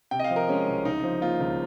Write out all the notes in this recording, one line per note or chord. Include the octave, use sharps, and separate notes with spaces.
C3 G5
D#5
F5
F3
A#4
G#3 C#4
C2
C#3 D#4
F3
A#3 F4
C#2